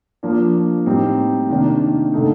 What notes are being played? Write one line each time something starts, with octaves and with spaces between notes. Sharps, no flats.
F3 A#3 D4
A2 G3 C4 D#4
C3 D#3 A#3 D4
D3 A3 D#4